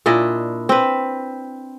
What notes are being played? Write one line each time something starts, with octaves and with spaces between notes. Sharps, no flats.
A#2 D4 E4 D#5
C4 B4